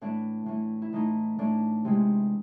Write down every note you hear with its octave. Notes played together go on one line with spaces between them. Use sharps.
A2 E3 A3 D4 E4
A2 E3 A3
E4
A2 E3 A3 D#4
A2 E3 A3 D4
C3 E3 G#3